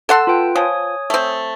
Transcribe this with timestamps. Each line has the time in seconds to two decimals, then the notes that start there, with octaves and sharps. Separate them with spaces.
0.09 A4 F#5 A5 C6 E6
0.27 F4 B4 G5
0.56 F3 C#5 G#5 D#6
1.10 A3 C4